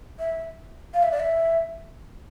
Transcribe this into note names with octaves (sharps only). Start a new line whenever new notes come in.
E5
F5
E5
D5
E5